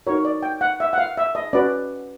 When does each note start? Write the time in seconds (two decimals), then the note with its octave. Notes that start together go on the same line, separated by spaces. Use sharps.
0.07 D#4 F#4 A#4 C#5
0.25 D5
0.43 G5
0.61 F#5
0.80 E5
0.93 F#5
0.98 F5
1.17 E5
1.35 D#5
1.53 C#4 F#4 B4 D5